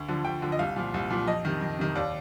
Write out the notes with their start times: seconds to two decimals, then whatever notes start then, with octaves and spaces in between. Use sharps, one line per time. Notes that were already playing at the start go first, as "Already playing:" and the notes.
Already playing: D2
0.08 D3 F3
0.25 D2 G5
0.42 D3 F3
0.52 D#5
0.59 C2 F5
0.76 A#2 F3
0.94 C2
1.10 A#2 F3
1.27 F2 D#5
1.45 C3 D#3
1.61 F2
1.79 C3 D#3
1.95 D#2 D5